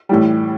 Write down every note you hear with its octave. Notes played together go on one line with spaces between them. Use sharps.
A2 E3 G3